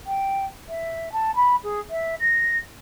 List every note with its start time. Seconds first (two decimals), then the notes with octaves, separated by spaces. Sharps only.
0.06 G5
0.69 E5
1.12 A5
1.36 B5
1.64 G#4
1.90 E5
2.20 A#6